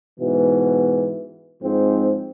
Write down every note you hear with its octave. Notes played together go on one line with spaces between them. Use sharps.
G#2 B2 E3
G#2 F3 C4